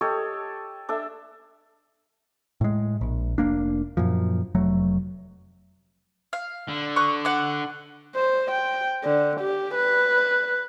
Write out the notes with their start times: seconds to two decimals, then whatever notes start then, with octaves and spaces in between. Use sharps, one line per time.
0.01 G4 A4 C#5 D#5
0.89 D4 A4 E5
2.61 A2 G#3
3.01 A#1
3.38 F1 A#3 D4
3.97 F#2 A#2 F3
4.55 F1 F#3 A3
6.33 F5
6.68 D3
6.96 C#6 D#6 F#6
7.25 F#5 D6
8.16 C5
8.51 G5
9.04 D3
9.40 G4
9.75 B4